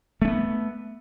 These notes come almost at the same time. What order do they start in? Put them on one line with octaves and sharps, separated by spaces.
A3 C#4 B3